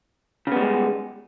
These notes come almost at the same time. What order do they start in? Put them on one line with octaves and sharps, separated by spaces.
C#3 B3 G3 G#3